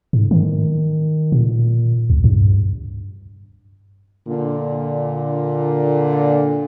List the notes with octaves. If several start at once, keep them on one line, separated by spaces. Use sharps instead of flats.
G#2
D#3
A#2
C#2
G2
A#2 D3